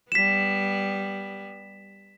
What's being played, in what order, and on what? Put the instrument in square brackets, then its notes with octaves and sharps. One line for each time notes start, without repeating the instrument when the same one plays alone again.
[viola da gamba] G3 B3 [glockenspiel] B6 E7